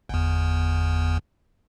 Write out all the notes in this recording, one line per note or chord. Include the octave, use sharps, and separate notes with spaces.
G1 E2